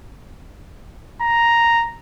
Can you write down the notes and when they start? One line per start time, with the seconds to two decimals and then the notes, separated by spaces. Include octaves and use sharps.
1.22 A#5